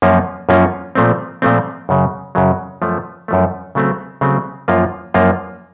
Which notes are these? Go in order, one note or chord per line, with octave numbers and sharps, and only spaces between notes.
F#2 F3 A#3 C#4 F4
F#2 F3 A#3 C#4 F4
A#2 F3 A3 C4
A#2 F3 A3 C4
F#2 C#3 F#3
F#2 C#3 F#3
F#2 F3 A3
F#2 F3 A3
C#3 F#3 A3 C4
C#3 F#3 A3 C4
F#2 F3 A#3 F4
F#2 F3 A#3 F4